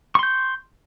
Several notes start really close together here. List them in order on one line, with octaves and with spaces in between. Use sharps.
C#6 C6 G6